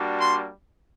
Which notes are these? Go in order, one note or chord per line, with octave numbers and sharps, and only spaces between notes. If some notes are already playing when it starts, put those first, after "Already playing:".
Already playing: G3 A#3 D4 F#4
C6